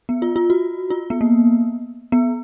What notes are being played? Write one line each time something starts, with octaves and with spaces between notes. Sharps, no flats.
B3
F4
F4
F#4
F4
B3
A#3
B3